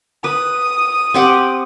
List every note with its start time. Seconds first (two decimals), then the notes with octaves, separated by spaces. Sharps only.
0.24 B4 D#6
1.14 C4 G4 F#5